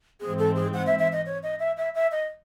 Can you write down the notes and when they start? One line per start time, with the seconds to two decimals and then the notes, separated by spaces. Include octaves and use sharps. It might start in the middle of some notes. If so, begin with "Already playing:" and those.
0.21 G#2 E3 C4 G#4
0.39 A4
0.55 G#4
0.74 F#5
0.86 E5
0.99 E5
1.12 D#5
1.26 C#5
1.43 D#5
1.59 E5
1.77 E5
1.95 E5
2.11 D#5